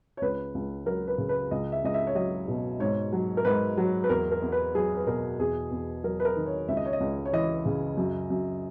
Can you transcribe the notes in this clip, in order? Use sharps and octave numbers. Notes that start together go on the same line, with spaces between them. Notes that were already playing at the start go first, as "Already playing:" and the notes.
C#5
C#2 B4
C#2
F#3 A#4
B4
C#3
B4
C#2 D#5
E5
C#2 D#5
E5
C#5
F#3 D#5
B2
G#2 C#5
F#3
A#4
G#2 B4
F#3
B4
E2 A#4
A#4
E2
B4
F#3 G#4
B4
B2 A#4
E2 G#4
E2
F#3 A#4
B4
A#4
D#3
C#5
C#2 E5
D#5
C#5
D#5
C#2
C#5
E3 D#5
C#3
F#2
F#2